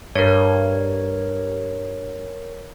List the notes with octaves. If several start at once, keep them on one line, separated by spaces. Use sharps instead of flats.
G2 A#4 C#5